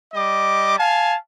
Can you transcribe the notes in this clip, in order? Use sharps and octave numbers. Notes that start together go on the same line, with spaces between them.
G3 D#5 D6
F5 G#5 A5